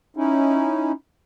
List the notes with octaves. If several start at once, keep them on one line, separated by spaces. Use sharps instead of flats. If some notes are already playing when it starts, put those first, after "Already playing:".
C#4 D#4 E4